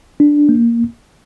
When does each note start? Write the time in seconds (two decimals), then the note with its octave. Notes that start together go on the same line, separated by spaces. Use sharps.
0.20 D4
0.49 A#3